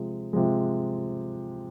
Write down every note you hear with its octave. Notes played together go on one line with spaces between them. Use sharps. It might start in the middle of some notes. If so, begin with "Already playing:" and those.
Already playing: C3 F3 G#3
C3 F3 G#3